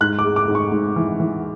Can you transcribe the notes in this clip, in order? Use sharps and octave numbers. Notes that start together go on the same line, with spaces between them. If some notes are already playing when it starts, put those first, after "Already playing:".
G#2 F#6
D6
G#3
D6
G#2
C#6
G#2
E3
E3